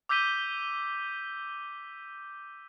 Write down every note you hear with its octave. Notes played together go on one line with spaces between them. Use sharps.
D6 E6 G6 B6 D#7 G7